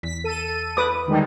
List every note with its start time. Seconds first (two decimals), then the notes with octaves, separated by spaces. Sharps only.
0.03 E2 B6
0.24 A4 D#7
0.77 B4 D6 D#6
1.08 D3 D#3 G3 G#3